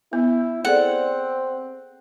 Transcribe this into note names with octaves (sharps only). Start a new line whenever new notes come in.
B3 E4
C4 G#4 A4 D5 F#5